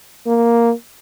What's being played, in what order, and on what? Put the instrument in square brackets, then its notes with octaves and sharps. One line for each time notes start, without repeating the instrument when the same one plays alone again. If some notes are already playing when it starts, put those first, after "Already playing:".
[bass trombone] A#3